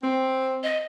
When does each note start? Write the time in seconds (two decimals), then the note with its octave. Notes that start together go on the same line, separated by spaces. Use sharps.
0.02 C4
0.64 D#5